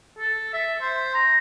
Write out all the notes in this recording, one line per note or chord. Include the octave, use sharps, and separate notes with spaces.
A4
E5
C5
A#5